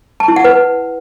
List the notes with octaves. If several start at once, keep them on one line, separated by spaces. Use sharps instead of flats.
A5
E4
F#5
B4